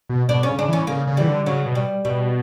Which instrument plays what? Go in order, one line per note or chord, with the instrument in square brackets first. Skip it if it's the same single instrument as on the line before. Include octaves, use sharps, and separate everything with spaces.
[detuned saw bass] B2
[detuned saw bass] B2 [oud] D4
[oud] C#4
[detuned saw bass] C#3
[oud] D4
[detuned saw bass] E3 [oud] C#4
[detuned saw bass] C#3 [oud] A#3
[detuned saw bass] C#3
[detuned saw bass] E3 [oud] G3
[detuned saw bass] D3
[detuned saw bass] C#3 [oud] F#3
[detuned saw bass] B2
[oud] G3
[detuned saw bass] B2 [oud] G3